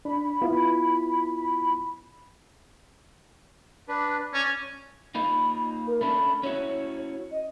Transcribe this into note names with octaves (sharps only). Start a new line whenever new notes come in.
D4 B5
B3 E4 F4
D4 B4
C#4 D5
A#3 D#4 F4 B5
A#4
A3 C#4 D4 B5
C#4 E4 F#4 C#5
D#5